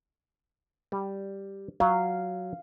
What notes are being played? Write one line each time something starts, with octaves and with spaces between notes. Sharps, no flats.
G3
F#3 F5